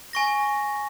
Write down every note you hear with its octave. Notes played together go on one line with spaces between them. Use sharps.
G#5 C#6 A#6